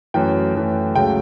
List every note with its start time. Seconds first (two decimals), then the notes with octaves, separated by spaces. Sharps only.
0.14 F#2 E3 A3 G5
0.55 F#2 E3 A3
0.95 C#2 C#3 F#3 A3 G5